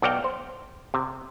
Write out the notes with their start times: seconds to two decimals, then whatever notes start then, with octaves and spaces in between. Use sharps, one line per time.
0.02 B1 F#4 D5 F5 G5
0.24 C5
0.94 C3